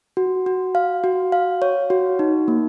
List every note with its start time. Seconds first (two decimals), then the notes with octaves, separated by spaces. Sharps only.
0.17 F#4
0.46 F#4
0.75 F5
1.04 F#4
1.32 F5
1.62 C#5
1.90 F#4
2.19 D#4
2.48 A#3